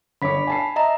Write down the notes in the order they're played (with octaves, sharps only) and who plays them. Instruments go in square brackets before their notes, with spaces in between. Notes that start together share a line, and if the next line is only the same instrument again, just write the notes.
[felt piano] G1 C#5 D6 [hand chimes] B5 B6
[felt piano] G#5 A5 C7
[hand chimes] D#5 E5 A#5